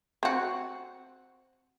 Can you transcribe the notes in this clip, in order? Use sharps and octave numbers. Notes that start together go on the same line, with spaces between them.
C4 F#4